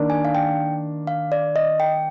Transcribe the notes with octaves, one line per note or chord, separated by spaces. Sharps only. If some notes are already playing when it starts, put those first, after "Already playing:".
Already playing: D#3 A#3 D4
G#5
F5
G5
F5
D5
D#5
G5